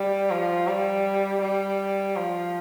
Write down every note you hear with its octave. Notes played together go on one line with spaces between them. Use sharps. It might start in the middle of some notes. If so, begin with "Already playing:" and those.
Already playing: G3
F3
G3
G3
F3